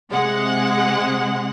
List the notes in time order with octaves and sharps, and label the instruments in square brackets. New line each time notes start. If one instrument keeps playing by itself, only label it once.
[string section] C3 G#3 F#5